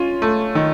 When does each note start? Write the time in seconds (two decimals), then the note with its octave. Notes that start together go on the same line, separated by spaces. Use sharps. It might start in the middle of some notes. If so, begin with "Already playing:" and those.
Already playing: C#4 F4
0.22 A3
0.55 D#3